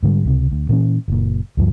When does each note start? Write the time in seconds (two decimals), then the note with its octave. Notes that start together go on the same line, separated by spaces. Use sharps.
0.03 G#2 D3 F#3 G3
0.25 C#2 C3
0.52 D2
0.69 A#2 E3 C#4
1.08 F#1 A#2
1.57 D2 G2 F3